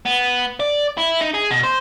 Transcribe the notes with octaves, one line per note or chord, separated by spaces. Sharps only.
B3
D5
E4
D#4
G#4
B2
C5